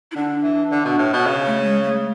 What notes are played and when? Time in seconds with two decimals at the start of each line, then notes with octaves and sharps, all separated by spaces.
0.12 E4
0.16 D3 D4
0.43 E3
0.71 D3
0.85 B2
0.99 A2
1.13 B2
1.27 C#3
1.46 A3
1.64 G#3
1.83 A3